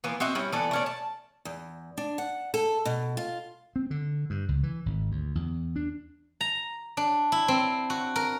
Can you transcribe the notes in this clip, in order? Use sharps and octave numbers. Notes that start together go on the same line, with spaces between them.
E3 F3 A#3 B3
C4 F#4 D#5 E5
G3 C#4 E4
E3 B3 A4 D5
A3 C#4 D4
A5
E2
D4
F#5
A4
B2
F4
C4
D3
G2
C#2
E3
G#1
D2
E2
D4
A#5
D4
E4
C4
F#4
A#4